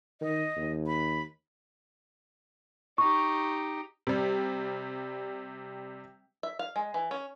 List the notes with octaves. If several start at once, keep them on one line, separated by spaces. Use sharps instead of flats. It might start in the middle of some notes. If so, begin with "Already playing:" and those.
D#3 D#5
D#2
B5
D#4 G4 C#6
C3 G3
E5
F5
G#3
E3
C#4